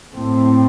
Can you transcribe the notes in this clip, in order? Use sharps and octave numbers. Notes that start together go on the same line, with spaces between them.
A2 A3 C4